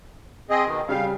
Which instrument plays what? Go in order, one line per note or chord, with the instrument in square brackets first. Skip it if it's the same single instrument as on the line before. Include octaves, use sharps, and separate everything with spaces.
[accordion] C4 G#4 D#5
B2 D#3
[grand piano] C#3 G3 [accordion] F5